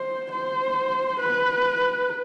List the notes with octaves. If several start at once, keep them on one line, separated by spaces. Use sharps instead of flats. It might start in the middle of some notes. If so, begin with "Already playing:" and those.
Already playing: C5
C5
B4